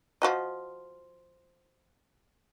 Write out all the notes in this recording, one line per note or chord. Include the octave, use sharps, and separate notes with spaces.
F3 F#4 D#5